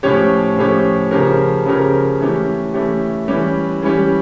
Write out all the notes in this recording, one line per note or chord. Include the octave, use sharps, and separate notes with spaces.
A2 F3 C#4 G4 C#5
A2 F3 C#4 G4 C#5
C#3 F3 C#4 G4 A#4
C#3 F3 C#4 G4 A#4
E3 A3 C#4 G4
E3 A3 C#4 G4
E3 G3 C#4 G4
E3 G3 C#4 G4